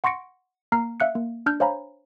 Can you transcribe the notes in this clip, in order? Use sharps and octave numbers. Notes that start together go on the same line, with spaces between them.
F#5 C6 C#6 A#6 C#7 D7
A#3 A#5 F6 C7
E5 F5 F#6 C#7
A#3
D4 F6 G6
C5 C#5 F5 G#5 A#5 B5